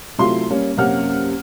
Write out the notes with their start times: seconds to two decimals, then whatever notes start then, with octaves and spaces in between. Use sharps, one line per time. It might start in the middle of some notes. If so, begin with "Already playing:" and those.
0.18 C3 F#3 A3 E4 F4 C6
0.50 G3 A#3 C#4
0.77 F#2 C3 A#3 C#4 F#5 F6